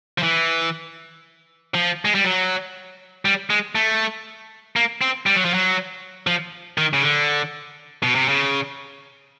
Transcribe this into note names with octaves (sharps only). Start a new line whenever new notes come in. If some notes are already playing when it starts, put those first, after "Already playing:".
F3
E3
F3
G#3
G3
F#3
G3
G#3
A3
A#3
C4
G3
F#3
F3
F#3
F3
D#3
C#3
D3
B2
C3
C#3